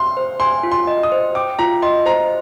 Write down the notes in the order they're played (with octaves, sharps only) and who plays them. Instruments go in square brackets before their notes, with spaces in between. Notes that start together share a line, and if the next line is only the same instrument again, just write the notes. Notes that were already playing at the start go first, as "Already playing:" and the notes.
Already playing: [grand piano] C6
[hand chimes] C5
[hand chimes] G#5 [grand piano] C6
[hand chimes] F4
[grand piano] C6
[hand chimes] D#5
[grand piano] D#6
[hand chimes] C5
[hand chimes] G5 [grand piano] D6
[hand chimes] F4 [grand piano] A#5
[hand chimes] D#5 [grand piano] C6
[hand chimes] C5 [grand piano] A#5